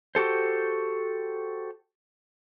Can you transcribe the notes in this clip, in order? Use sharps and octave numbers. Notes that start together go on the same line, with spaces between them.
F#4 G4 A4 C5